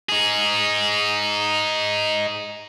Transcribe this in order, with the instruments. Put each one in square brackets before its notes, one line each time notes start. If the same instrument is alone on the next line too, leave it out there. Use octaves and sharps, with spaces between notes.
[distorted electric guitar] D#4 G#4